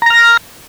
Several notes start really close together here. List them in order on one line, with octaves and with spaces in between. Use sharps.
A#5 A#6 F6